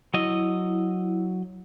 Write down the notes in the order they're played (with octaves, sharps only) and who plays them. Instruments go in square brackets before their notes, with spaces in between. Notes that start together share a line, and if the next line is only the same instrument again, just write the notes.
[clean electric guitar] F#3 D#5 [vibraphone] E4